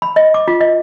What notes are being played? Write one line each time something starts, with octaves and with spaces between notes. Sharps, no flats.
B5
D#5
D6
F4
D#5